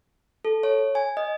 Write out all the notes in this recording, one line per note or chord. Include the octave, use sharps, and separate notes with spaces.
A4
C#5
G#5
D#5